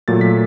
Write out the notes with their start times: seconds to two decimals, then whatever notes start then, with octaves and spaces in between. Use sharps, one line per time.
0.08 A#2 F#3 A3 A6
0.21 B6